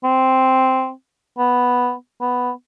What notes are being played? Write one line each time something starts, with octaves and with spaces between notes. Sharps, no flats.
C4
B3
B3